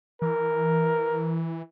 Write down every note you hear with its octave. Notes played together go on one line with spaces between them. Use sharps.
E3 A#4